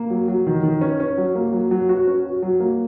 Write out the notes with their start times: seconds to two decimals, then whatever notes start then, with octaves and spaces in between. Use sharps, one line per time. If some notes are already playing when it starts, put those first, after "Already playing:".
Already playing: A#3
0.10 F#3
0.28 F#3
0.47 D#3
0.63 D#3
0.81 C#4
1.00 C#4
1.17 F#3
1.35 A#3
1.53 F#3
1.71 F#3
1.89 F#4
2.07 C#4
2.25 F#4
2.42 F#3
2.60 A#3